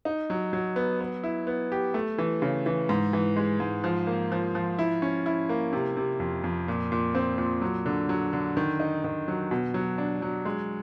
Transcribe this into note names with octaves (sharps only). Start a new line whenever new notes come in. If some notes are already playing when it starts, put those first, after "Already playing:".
D#4
F#3
F#3
B3
B3
E4
B3
G4
A3
E3
C#3
E3
G#2
E3
G#3
G#2
F3
A#3
F3
F3
E4
C#4
E4
A#3
C3
C3
F2
F2
A#2
A#2
C4
A#2
F#3
D3
F#3
D3
D#3
D#4
D#3
F#3
B2
F#3
D4
F#3
G#3